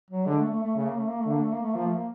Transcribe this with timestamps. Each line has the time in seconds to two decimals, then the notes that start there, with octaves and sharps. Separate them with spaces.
0.10 F#3
0.26 D3 G#3
0.39 A3
0.51 A3
0.63 A3
0.76 C#3 A3
0.87 A#3
0.97 A3
1.08 A#3
1.20 A3
1.26 D3
1.31 A#3
1.41 A3
1.53 A#3
1.63 A3
1.75 F3 A#3
1.85 A3
1.95 A#3